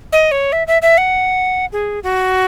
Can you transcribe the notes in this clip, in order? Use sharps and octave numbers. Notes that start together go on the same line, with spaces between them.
D#5
C#5
E5
E5
E5
F#5
G#4
F#4